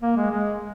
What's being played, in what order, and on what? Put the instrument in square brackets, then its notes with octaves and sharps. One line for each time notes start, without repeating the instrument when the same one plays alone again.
[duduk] A#3
G#3
G#3